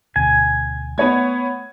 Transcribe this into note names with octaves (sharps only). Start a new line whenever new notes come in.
D2 B2 G#5
A3 B3 C#5 G#6